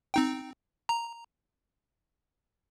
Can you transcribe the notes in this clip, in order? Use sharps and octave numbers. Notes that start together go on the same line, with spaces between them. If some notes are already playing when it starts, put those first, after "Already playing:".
C4 D#4 G5
A#5